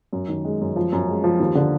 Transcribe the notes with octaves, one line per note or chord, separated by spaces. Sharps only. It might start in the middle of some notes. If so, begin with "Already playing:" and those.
F#2
D#3
G#3
F#2
F3
F#2
G#3
F3
D#2
D3